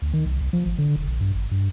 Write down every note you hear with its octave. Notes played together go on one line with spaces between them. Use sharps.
D2
D#3
C2
C2
F3
G#1
D3
E1
A#1
G2
G#1
G2